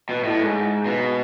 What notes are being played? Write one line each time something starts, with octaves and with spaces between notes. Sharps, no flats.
B2
A2
G#2
B2